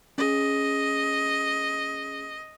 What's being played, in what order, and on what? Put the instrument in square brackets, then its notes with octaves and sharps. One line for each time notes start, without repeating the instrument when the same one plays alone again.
[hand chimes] C#4 G#4 [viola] D#5